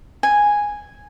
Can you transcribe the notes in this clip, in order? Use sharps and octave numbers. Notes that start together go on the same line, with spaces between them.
G#5